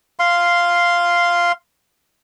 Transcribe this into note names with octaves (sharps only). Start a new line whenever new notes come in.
F5 C6